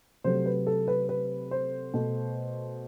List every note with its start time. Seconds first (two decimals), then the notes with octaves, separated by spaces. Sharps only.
0.24 C3 F#3 A3 C5
0.46 B4
0.67 A4
0.88 B4
1.09 B4
1.51 C5
1.94 B2 A3